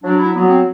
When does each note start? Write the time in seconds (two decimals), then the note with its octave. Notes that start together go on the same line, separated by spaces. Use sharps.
0.03 F#3 D4
0.19 E4
0.34 F#3 B3
0.49 C4